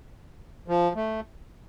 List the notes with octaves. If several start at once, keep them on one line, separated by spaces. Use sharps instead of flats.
F3
A3